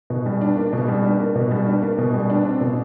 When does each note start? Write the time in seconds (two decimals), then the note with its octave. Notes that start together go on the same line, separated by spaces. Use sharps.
0.10 B2
0.26 G3
0.41 D4
0.57 A#3
0.73 B2
0.88 G3
1.04 D4
1.20 A#3
1.35 B2
1.51 G3
1.67 D4
1.82 A#3
1.98 B2
2.14 G3
2.30 D4
2.45 C4
2.61 B2